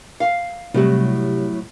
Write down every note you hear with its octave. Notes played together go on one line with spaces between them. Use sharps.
F5
A2 C3 F#3 G3